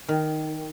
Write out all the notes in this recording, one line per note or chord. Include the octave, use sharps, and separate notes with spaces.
D#3